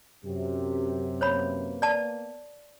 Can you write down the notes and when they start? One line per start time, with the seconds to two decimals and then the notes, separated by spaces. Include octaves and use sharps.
0.24 F#2 C3 G4
1.21 A#3 B3 C5 C#5 B5
1.82 D5 A5